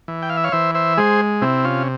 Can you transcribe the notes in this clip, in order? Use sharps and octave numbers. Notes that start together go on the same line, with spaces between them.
E3
G5
F5
E5
C#5 F5
E3 C5 E5
C5 E5
G#3 G#4 C5
C3 C4 E4
C#4 F4